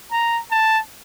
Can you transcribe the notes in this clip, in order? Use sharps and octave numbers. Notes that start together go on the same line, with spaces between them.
A#5
A5